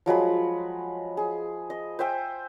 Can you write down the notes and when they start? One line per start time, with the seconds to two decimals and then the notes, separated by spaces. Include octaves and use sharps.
0.06 F3 F#3 G#3 B5
1.17 G#4
1.70 D#5
1.99 C5 E5 G5 G#5